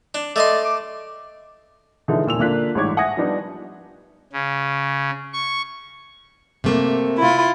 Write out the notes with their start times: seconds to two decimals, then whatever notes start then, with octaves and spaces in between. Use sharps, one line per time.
0.15 D4
0.36 A3 D5 D#5 C6
0.65 D6
2.08 D3 E3 F3 G#3 D#4 E4
2.26 D#2 A#2 E6 F7
2.39 D3 A#3 D4 F4 F#6 B6
2.75 A1 G#2 G3 C#5 D6 G#6
2.97 E5 F#5 G#5 D#6 G#6 A#6
3.17 F3 G3 B3 D4 D#4
4.33 C#3
5.33 C#6
6.64 C3 A3 A#3
7.18 E4 F4